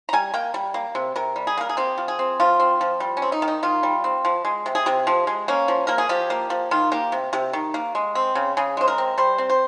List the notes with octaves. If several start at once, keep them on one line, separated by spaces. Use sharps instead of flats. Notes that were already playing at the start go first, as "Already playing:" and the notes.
A#5
G3 G#5
A#3 G5
G3
A#3
C3
C3 A#4
G3
G#4
A#3 A#4
G#4
C4 G4
F3
G#4
C4
F3 F4
C4
F3
G3
C#4
C4
D#4
D#3
D#4
D#3 F4
G3
C4
F3
G#3
C3
G#4
C3 G4
F3
G#3
A#3 C#4
F3
A#3 A#4
G#4
F3 G4
A#3
F3
D#3 F4
A#3 G4
C3
C3 G4
D#3
A#3
G#3
C4
C#3
C#3 G#4
G#3 C5
A#4
C4
G3 C5
C4
C5